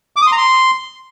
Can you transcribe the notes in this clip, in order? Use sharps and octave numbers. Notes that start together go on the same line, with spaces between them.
D6
D#6
C6
A#5
C6